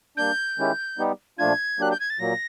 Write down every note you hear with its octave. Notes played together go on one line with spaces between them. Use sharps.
G3 A#3 D4 G6
D#3 G#3 C#4 E4 G4
G3 B3 D#4 G4
A#2 F3 A3 D4 F4 G#6
F#3 A#3 D4 G4 F#6
G6
G#6
A6
A#2 F#3 A#3 A#6